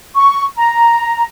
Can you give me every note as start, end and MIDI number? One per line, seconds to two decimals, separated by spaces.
0.16 0.43 85
0.56 1.24 82